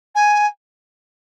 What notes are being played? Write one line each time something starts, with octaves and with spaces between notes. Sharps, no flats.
G#5